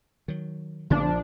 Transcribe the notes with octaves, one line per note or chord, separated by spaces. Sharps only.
D#3 F#3
A#1 C#3 F3 B3 C4 D4